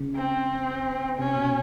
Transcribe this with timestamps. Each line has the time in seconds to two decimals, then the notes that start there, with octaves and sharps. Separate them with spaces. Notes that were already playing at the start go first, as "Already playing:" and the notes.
Already playing: C#3
0.15 C4
1.19 C3 C#4
1.36 B2